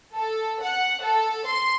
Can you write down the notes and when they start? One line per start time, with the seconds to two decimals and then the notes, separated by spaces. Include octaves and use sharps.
0.14 A4
0.62 F#5
1.02 A4
1.47 C6